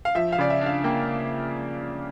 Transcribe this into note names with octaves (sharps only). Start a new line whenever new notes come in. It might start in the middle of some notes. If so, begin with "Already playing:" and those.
F5
F3 E5
F5
C#3 D5
E5
D4 F5
A#3 G5